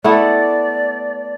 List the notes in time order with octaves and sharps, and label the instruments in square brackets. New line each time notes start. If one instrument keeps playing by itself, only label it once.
[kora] A3 B3 E4 [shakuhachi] D5